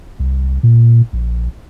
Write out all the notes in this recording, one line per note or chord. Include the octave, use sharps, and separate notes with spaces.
C2
A#2
A#1